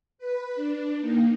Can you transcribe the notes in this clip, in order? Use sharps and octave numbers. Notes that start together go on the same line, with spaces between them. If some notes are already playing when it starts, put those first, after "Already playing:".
B4
D4
A#3 D#4